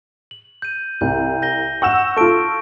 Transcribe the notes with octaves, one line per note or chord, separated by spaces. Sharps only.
F#7
G6 D#7
C2 G6
G6 A#6 G7
F#5 C#6 E6 E7
F4 A4 C#6 D7